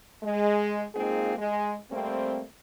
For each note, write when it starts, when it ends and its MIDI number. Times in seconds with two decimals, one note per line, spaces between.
0.23 0.84 56
0.94 1.33 56
0.94 1.33 58
0.94 1.33 60
0.94 1.33 63
0.94 1.33 65
0.94 1.33 68
1.37 1.76 56
1.91 2.41 55
1.91 2.41 57
1.91 2.41 58
1.91 2.41 60